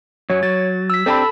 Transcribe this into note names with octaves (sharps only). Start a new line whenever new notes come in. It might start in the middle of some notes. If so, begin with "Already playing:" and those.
F#2 F#3 C#5
F#3 A6
E6 B6
C4 D4 G4 A4 A5 B5